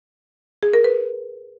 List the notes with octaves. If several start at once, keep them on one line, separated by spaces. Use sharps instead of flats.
G#4
A#4
B4